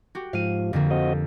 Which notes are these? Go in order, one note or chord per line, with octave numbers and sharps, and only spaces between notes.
F#4 G4
G#2 F3 F5 D#7
F2 D3 A#3
C4 F#4 D#5